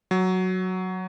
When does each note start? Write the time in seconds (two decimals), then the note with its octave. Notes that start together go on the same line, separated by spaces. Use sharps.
0.11 F#3